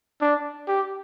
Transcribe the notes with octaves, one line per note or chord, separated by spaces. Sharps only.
D4
G4